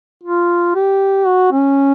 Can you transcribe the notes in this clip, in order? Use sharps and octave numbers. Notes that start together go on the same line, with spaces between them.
F4
G4
F#4
C#4